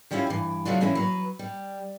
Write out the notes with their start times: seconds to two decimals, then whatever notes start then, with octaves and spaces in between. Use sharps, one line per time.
0.11 F3 G3 B3 C#4 E4 F4
0.27 G2 E3
0.65 C#3 E3 F#3 A3 D4 F4
0.81 E3 F3 A#3 C#4 E4
0.95 F#3 B4
1.39 G3